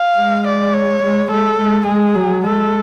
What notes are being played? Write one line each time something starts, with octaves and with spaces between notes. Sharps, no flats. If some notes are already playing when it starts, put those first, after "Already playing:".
Already playing: F5
G#3
D5
C#5
G#3
G#3 A4
G#3
G#3 G#4
F#3
G#3 A4